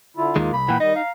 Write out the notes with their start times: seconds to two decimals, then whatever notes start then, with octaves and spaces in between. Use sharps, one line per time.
0.17 D3 E4 F4
0.36 D#2 D#3 G#3 A#3
0.53 C2 B5
0.69 A#2 E3 F#5 G5
0.80 D#3 G3 D#4 D#5
0.96 F5 A#5